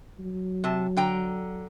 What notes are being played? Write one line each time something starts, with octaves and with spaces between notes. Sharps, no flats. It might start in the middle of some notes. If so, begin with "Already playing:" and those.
F#3
C3 A5
D3 G5 A#5